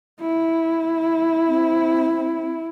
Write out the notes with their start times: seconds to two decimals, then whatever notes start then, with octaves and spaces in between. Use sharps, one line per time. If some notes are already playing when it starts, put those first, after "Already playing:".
0.21 E4
1.48 C4